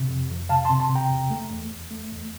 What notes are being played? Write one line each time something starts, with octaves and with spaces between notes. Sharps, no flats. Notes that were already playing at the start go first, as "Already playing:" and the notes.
Already playing: C3
F2
F2
C3 F5 A5
A5 C6
C3
A5 C6
C3
G5 A#5
E2
A3
E2
E2
A3
E2